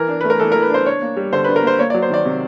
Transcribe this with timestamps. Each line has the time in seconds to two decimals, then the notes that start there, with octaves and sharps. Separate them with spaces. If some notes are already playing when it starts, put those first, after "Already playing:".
Already playing: E3 A#4
0.09 D4
0.21 A3 B4
0.30 A#4
0.40 E3 A4
0.52 A#4
0.55 E3
0.62 B4
0.70 D4 C5
0.86 D4 C#5
1.02 A#3
1.17 G3
1.33 D3 C5
1.45 B4
1.48 D4
1.56 A#4
1.63 A#3 C5
1.79 A#3 C#5
1.90 D5
1.94 F#3
2.02 C5
2.10 D#3 D5
2.25 C3